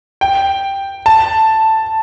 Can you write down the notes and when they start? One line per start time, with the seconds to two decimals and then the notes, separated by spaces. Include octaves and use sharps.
0.21 G5
1.06 A5